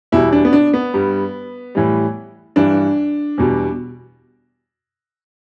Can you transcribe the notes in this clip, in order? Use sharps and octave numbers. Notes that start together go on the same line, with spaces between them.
E2 B2 G3 E4
D4
B3
D4
B3
G2 G3
A2 E3 G3
G2 E3 G3 D4
E2 B2 G3